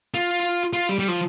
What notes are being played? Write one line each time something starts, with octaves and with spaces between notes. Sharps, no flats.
F4
F4
G3
G3
F3